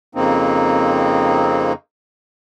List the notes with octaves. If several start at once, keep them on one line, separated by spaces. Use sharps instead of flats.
F2 C#3 A#3 C4 D#4